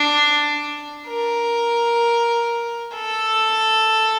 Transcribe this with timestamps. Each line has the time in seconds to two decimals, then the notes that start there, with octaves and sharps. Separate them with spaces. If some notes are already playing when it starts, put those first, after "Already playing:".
Already playing: D4
1.08 A#4
2.95 A4